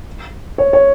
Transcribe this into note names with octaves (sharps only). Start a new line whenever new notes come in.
C#5
C#5